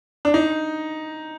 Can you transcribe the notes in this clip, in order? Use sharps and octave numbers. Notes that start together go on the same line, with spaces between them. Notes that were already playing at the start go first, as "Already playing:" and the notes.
D4
D#4